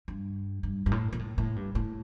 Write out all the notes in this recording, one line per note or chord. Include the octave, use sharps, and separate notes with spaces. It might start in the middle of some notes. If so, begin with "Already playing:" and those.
G2
G2
G2
A2
A#2
A2
A2
G2
A2